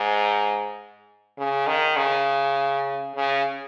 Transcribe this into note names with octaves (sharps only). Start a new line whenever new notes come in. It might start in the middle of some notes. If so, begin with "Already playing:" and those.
Already playing: G#2
C#3
D#3
C#3
C#3